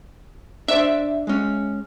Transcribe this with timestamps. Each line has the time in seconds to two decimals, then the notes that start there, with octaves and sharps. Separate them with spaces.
0.68 D4 C5 D5 E5
1.27 G#3 C#4